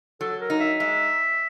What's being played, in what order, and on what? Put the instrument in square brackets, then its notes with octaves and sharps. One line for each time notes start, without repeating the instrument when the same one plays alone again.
[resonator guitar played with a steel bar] F#3 [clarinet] A4
[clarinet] A#4
[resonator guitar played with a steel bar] D#4
[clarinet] E5
[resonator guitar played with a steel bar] G#3 [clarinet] E5